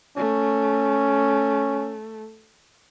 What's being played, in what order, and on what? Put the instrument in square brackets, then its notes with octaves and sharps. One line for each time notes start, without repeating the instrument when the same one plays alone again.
[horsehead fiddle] A3 [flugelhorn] C#4